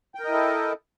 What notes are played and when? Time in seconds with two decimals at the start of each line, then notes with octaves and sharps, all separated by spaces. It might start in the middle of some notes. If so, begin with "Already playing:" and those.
0.15 G5
0.20 A#4
0.24 D#5
0.29 E4
0.34 A4